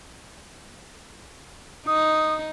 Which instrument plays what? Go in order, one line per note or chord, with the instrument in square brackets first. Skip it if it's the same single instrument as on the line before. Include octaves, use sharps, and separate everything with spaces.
[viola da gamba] D#4 [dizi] D#6